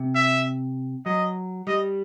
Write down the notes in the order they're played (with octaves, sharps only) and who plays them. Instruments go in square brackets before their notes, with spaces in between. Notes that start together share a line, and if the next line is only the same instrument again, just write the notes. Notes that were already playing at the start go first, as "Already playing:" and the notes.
Already playing: [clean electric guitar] C3
[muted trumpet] E5
[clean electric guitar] F#3 [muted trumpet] D#5
[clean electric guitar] G3 [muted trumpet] D#5